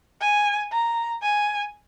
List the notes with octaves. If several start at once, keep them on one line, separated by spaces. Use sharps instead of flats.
G#5
A#5
G#5